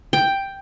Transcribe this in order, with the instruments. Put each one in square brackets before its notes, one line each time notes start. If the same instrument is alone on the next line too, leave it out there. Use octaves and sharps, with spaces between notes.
[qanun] G5